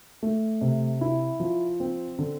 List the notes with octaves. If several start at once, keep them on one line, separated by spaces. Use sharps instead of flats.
A3
C3
E4
F3
C4
D3